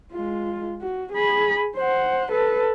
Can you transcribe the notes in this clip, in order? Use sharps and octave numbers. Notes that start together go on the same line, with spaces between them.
G#3 F4
F#4
G#4 B5
C5 F#5
A4 B4